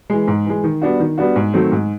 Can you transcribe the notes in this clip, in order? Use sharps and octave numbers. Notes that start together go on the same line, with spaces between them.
E3 G#3
G#2
E3 G#3
D#3
G3 B3 D4 F#4
D#3
G3 B3 D4 F#4
G#2
D#3 F#3 A3 C4
G#2